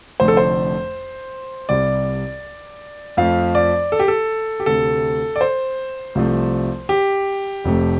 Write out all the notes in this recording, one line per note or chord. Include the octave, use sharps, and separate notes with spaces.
F1 F2 D3 A3 C5
A4
C5
C2 C3 G3 D5
F2 F3 A3 F5
D5
A4
G4
A4
G4
D2 C3 A3 A4
D5
C5
C2 C3 F3 A3
G4
F1 F2 C3 A3